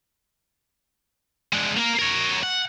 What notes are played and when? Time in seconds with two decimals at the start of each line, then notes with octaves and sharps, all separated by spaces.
1.53 G#3 D4
1.77 A#3 A#4
1.99 A#4 C#5
2.43 F#5